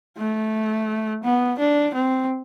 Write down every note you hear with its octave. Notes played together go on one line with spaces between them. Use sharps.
A3
B3
D4
C4